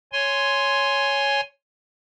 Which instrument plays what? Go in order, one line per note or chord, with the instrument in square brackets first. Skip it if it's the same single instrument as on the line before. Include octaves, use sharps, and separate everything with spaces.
[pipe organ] C#5 G#5 C6